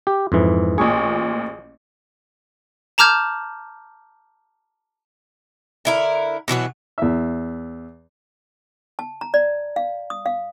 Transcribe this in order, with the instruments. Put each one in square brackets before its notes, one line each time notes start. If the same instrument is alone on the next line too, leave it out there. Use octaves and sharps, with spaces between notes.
[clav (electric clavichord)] G4
F2 G#2 E3
[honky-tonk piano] A1 A#2 C#6 [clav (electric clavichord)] G#4
[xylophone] A5 A#5 D6 F6 G6 G#6
[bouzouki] D3 E4 A#4
B2 E3 F#3 F#4
[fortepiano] E2 E5
[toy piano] A5
A#5
D5
F5
D#6
F5